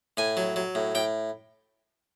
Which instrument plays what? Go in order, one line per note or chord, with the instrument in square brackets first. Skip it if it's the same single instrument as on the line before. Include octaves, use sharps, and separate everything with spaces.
[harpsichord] A2 G#5
F#3
F#3
A2
A2 G5